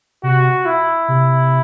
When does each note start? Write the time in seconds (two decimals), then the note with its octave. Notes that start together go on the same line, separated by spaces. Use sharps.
0.23 C3 F#4
0.66 E4
1.08 C3